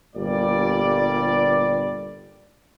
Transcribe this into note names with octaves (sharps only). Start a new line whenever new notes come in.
G1 A#2 G3 D5